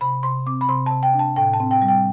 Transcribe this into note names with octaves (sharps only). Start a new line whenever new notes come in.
C3 B5
C3 C6
C4 D6
B5
C3 C6
C3 A5
G5
D4
A5
A2 G5
A5
C4
G5
G3
G5